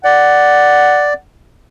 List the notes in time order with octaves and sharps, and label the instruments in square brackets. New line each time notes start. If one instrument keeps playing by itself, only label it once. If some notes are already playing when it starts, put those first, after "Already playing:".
[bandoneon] D5 [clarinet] F#5